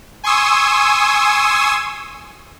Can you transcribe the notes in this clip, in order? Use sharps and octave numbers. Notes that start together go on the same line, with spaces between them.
G#5 C6 C#6 D#6 E6